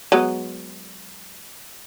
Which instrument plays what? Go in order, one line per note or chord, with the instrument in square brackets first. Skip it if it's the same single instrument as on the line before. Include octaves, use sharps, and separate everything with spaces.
[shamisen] F#3 G#3 B3